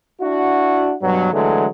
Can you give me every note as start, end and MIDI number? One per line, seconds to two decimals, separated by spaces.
0.21 0.94 62
0.21 0.94 64
0.21 0.94 66
1.01 1.31 43
1.01 1.31 47
1.01 1.31 54
1.33 1.66 50
1.33 1.66 52
1.33 1.66 54
1.33 1.66 56
1.33 1.66 57